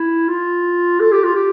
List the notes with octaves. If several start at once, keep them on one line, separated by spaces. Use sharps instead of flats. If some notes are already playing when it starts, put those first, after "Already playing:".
Already playing: E4
F4
A4
G4
F4
G4